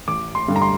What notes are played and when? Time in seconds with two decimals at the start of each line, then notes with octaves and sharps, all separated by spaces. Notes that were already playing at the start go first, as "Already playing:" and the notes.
0.08 A1 D6
0.35 C6
0.48 G2 D3 G3
0.56 A#5
0.62 C6